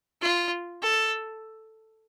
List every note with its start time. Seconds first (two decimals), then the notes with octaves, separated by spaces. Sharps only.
0.22 F4
0.83 A4